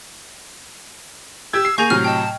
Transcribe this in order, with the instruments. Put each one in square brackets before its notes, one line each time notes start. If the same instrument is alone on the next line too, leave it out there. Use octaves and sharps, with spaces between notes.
[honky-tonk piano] G4 G#6 [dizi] E6
[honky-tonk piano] C7
[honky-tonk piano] A#3 G#4 F7 [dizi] G#5 [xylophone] C#6 G6 A#6
[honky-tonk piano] A2 C3 F#3 [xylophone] F6
[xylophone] D#5 G5 [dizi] A5